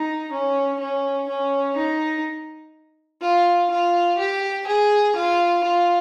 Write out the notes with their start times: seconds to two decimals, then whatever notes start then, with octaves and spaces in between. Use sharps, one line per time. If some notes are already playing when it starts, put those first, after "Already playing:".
Already playing: D#4
0.31 C#4
0.79 C#4
1.28 C#4
1.76 D#4
3.21 F4
3.70 F4
4.18 G4
4.67 G#4
5.15 F4
5.63 F4